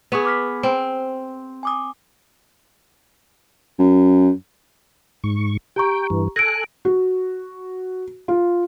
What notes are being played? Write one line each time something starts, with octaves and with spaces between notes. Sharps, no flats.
B3 G#4 B4 C#6 D#6
D6 F6 B6
C4 C5
G#5 D6 D#6
F#2
G#2 C#6
G4 G5 A#5 C#6
G2 E3
A4 G#5 F#6 A#6 D7
F#4
F4